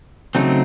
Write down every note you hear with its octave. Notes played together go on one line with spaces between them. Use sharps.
C#3 F#3 A3 C4 D#4